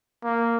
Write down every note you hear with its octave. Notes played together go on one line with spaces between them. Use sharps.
A#3